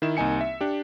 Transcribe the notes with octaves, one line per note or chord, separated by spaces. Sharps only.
D#3 E4 E7
C2 A#3 D#4 G#5 C#7
E5
D4 G4